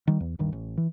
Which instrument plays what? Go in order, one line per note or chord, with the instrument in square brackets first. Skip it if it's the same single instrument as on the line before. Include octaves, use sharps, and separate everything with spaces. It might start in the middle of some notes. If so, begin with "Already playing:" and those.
[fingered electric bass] D#3 G3
E2
D1 G2 D#3
A1
E3